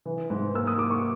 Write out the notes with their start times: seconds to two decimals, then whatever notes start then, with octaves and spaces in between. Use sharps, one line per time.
0.05 E3
0.30 G#2
0.54 A#3 E6
0.67 D#6
0.78 A#3 D6
0.90 C#6